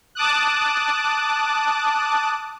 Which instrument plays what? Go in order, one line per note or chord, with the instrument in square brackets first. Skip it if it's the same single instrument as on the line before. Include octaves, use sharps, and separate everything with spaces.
[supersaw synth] A5 D6 D#6 F#6